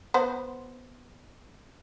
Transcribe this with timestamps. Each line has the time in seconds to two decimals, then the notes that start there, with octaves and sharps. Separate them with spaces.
0.14 B3 C5 F#5